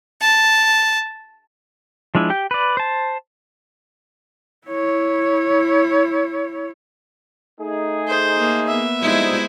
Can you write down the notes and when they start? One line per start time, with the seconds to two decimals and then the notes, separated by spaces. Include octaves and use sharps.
0.21 A5
2.15 F3 G#3 D4 E4
2.30 G4 G5
2.51 B4 D5
2.77 C5 A5
4.67 E4 C#5
7.60 A3 D#4 G#4
8.08 C5
8.37 A#3
8.66 B3 E5
9.01 F3 G3 G#3 D#4 E4 C5